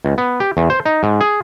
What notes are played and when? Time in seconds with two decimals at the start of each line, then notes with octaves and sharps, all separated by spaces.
0.05 C#2
0.18 B3
0.40 G4
0.57 E2
0.70 C5
0.85 D#4
1.03 G#2
1.21 G#4